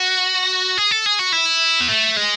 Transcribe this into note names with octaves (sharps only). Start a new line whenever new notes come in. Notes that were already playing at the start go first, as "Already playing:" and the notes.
Already playing: F#4
G#4
A4
G#4
F#4
E4
B3
A3
G#3